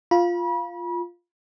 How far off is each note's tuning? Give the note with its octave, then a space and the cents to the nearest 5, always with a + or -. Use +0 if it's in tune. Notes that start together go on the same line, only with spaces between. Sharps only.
F4 +0 B5 -35